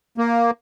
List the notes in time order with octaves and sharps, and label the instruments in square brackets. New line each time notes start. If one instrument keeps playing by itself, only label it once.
[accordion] A#3